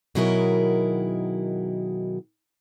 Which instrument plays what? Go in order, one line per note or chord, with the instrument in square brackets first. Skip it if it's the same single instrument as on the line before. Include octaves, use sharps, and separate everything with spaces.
[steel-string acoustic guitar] B2 D#3 F#3 E4 G#4 A#4